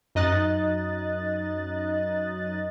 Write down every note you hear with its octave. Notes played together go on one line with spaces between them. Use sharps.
F#2 D#4 D#5 F#6 A6